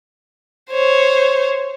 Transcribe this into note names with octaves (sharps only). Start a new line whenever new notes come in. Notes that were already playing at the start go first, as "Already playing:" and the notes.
C5 C#5